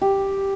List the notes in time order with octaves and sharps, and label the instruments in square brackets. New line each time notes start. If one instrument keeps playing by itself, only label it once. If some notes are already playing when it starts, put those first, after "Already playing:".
[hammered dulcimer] G4